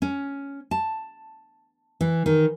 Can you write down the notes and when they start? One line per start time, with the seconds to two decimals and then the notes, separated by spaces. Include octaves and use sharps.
0.02 C#4
0.71 A5
2.01 E3
2.26 D#3